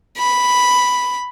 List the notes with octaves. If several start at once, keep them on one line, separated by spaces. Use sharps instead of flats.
B5